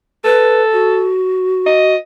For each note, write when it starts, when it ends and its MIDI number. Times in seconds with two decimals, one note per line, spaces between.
0.24 1.11 69
0.24 0.62 71
0.72 1.95 66
1.66 1.96 75